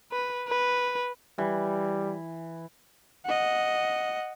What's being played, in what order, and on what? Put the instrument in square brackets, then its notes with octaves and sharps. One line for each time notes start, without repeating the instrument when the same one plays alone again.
[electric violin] B4
B4
[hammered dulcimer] E3 [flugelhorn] G3
[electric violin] D#5 F#5